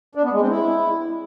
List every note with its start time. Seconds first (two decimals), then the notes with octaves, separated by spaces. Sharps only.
0.15 D4
0.24 B3
0.32 G#3
0.41 C4
0.50 E4